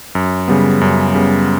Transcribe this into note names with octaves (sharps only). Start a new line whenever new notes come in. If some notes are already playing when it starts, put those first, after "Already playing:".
F#2
C#3 G3 B3
F#2
C#3 G3 B3